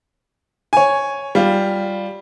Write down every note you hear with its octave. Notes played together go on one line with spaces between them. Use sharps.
C#5 G#5
G3 F4